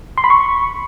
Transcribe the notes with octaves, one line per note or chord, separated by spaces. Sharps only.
C6
B5
C#6